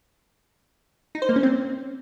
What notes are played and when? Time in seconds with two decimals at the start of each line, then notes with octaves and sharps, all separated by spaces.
1.15 D#4
1.22 C5
1.29 A#3
1.36 C#4
1.43 C4